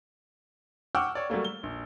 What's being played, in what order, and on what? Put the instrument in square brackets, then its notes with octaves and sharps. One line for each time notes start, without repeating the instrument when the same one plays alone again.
[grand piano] F#5 G5 C#6 D6 E6 F6
C#5 D5
F#3 G3 A3 A#3
G7
A#1